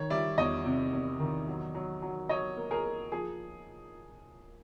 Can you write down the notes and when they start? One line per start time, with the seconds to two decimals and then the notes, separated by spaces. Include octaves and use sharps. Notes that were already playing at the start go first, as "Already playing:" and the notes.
Already playing: D#3 C#5
0.10 G3 D5 E5
0.38 E2 C#5 D#5
0.66 C3
0.93 E2
1.20 D#3
1.48 F#3
1.75 F#3
2.02 F#3
2.29 F#3 C#5 D#5
2.57 A#3
2.71 G#4 A#4
2.85 A#3
3.12 F3 G#4